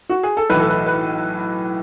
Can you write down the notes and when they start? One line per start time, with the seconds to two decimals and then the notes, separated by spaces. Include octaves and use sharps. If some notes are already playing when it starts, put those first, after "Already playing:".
0.10 F#4
0.23 G#4
0.37 A4
0.50 B1 A2 E3 B4
0.59 A4
0.68 B4
0.86 B4